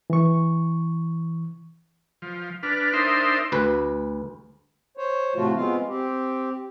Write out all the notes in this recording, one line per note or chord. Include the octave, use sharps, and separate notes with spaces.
E3 C#6
F3
D4 B4 F6
D4 D#4 A#4 C5 E5 C6
D2 B4
C5 C#5
A2 C3 F3 A3 F4 F#4
G#3 B3 C4 F4 F5
C4 G4